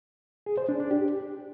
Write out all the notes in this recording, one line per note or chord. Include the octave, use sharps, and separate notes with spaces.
G#4
C5
D4
D4
G4